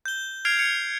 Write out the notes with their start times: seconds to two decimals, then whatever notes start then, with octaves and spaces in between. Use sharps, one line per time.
0.06 G6 G7
0.45 F6 G#6 C7 D7 F7
0.59 G#6 C#7 F7